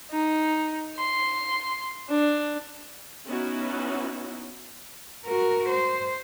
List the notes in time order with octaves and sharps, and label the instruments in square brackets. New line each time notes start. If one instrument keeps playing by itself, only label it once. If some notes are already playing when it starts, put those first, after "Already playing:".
[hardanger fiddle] D#4
C6
D4
[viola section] B3 C#4 D#4 E4 F#4
[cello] F#4 A#4
C5